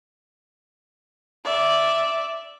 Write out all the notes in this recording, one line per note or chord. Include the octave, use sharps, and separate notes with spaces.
D5 E5